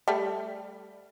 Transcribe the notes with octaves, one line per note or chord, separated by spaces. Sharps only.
G3 A3